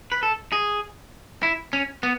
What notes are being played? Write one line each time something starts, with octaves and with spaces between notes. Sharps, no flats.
B4
A4
G#4
E4
C#4
B3